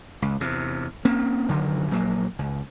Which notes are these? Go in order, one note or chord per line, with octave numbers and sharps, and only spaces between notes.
C#2
E2 C3
A#3 C4 C#4
F#1 D3 D#3 F#3
A#1 F#3 A#3
C#2